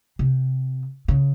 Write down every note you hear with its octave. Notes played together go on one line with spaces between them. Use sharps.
C3
C#3